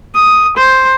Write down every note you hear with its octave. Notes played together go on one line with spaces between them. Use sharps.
D#6
C5